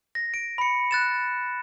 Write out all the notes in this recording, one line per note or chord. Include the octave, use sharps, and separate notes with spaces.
A#6
D7
B5 C#7
F#6 A6 E7